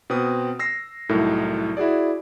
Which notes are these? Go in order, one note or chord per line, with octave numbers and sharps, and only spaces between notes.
B2 C4 B4 D#6
E6 A#6 C7
C2 A2 F#3 D#4 A4 A#4
E4 F#4 G#4 D5